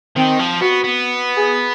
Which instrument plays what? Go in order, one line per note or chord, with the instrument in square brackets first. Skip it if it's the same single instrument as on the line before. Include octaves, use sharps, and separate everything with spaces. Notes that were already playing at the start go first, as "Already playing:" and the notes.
[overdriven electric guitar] D#3 [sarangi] C4
[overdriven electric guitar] F3
[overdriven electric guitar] B3 [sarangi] F#4
[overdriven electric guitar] B3
[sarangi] G#4